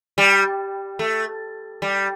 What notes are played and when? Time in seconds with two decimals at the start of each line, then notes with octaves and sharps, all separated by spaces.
0.18 G3
0.99 A3
1.82 G3